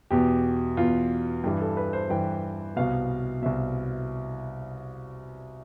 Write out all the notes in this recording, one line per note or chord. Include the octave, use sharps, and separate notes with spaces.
E2 B2 G4
E2 B2 F4
G2 E3 G4
A4
B4
C5
G2 E3 G5
C2 B2 F5
C2 B2 E5